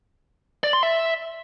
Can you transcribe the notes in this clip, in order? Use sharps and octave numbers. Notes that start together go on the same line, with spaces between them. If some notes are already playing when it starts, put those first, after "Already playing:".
D5
C6
E5